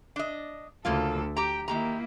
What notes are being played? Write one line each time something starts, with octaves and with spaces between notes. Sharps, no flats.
D4 D#5
D2 C#3 A#3 F4 A4
G4 G5 A#5
D#3 A#3 E4 G4 A#5